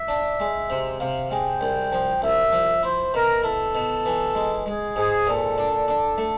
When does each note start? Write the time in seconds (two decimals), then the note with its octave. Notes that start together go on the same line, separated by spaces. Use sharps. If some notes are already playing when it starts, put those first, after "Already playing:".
Already playing: E5
0.08 D4
0.40 G#3
0.70 C3
1.00 C3 F5
1.31 G#3 G5
1.61 C2
1.92 F3
2.22 C2 E5
2.52 F3
2.83 E4 C5
3.13 B2 A#4
3.43 E4 A4
3.75 B2
4.06 E3
4.35 G#3
4.66 G#3 G#4
4.96 G#2 G#4
5.27 A#2 A4
5.58 D4
5.88 D4
6.18 A3